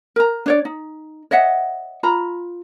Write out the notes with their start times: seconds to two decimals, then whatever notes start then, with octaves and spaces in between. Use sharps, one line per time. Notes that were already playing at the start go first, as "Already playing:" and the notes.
0.16 A#4 A#5
0.46 D4 C#5 D5
0.65 D#4
1.31 C#5 D#5 E5 F#5
2.03 F4 A#5 B5